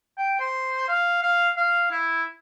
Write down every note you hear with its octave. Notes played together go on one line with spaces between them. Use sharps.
G5
C5
F5
F5
F5
E4